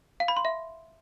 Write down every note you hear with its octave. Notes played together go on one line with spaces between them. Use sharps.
F5
B5
C6
E5